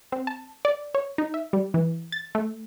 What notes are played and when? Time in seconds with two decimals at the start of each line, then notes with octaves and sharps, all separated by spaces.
0.12 C4
0.27 A5
0.65 D5
0.95 C#5
1.18 D#4
1.34 E5
1.53 G3
1.74 E3
2.12 A6
2.35 A3